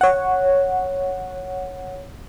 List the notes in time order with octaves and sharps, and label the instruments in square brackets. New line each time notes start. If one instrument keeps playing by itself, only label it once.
[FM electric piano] C#5 F#5